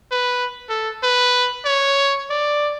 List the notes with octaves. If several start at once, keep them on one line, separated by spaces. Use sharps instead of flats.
B4
A4
B4
C#5
D5